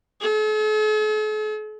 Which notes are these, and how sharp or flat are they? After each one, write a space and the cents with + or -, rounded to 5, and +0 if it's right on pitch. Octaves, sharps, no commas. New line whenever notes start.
A4 -45